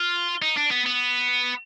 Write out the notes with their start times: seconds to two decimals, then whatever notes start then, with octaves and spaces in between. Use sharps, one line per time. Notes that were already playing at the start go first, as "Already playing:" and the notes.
Already playing: F4
0.42 D#4
0.57 D4
0.71 B3
0.86 B3